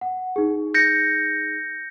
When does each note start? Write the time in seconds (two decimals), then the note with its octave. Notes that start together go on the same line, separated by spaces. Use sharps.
0.01 F#5
0.36 D#4 G#4
0.74 G6 A#6 C#7